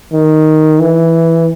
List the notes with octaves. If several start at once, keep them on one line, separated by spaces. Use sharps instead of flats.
D#3
E3